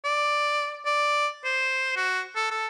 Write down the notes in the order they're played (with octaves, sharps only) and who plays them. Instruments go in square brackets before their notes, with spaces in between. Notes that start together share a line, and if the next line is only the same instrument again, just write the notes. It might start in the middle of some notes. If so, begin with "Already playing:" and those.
[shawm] D5
D5
C5
F#4
A4
A4